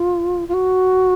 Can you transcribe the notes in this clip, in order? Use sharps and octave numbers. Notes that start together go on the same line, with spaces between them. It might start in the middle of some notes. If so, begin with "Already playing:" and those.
Already playing: F4
F4
F#4